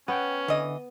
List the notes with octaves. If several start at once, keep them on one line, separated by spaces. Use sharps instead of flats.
B3 C#4 F#5 G5
D3 E3 D#5